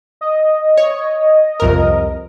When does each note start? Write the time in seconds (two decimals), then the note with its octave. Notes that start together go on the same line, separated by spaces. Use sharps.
0.21 D#5
0.77 C#5
1.60 C2 F2 A#4